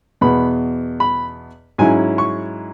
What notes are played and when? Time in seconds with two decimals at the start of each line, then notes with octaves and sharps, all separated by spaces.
0.21 E2 B2 B3 B5
1.00 B5
1.78 G#2 F#3 C#4 E4 G#5
2.18 C#6